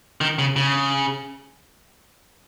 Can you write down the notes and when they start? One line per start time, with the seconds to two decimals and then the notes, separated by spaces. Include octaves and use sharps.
0.21 D#3
0.39 C#3
0.56 C#3